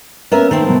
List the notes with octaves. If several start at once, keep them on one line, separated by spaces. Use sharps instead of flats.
A#3 B3 C#4 A#4 E5
D#3 A3 A#3 C4
B2 F#3 B3